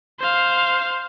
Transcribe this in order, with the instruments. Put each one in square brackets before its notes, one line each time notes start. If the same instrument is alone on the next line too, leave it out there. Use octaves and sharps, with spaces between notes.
[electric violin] C5 F5